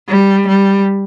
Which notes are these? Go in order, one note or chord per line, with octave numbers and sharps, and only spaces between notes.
G3
G3